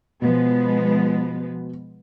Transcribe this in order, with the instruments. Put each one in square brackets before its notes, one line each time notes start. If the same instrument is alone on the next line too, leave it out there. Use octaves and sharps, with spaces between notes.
[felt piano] B2 [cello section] F3 G#3 B3